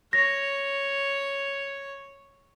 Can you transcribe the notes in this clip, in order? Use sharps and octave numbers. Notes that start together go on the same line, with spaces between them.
C#5 A#6